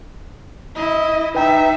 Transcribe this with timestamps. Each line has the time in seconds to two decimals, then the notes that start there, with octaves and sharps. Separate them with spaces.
0.75 E4 D#5
1.35 D#4 B4 E5 G5 A#5